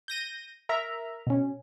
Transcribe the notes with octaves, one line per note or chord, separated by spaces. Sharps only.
G6 A#6 D#7
A#4 E5 A#5
B2 C#4